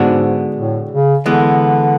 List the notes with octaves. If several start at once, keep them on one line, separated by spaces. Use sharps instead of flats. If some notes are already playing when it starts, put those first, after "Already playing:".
Already playing: G#2 D3 G#3 B3 D4 F#4
A2
C#3
D3 E3 G#3 B3